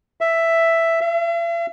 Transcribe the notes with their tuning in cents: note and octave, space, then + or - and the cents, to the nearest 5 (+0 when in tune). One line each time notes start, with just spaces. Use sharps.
E5 +5
E5 +45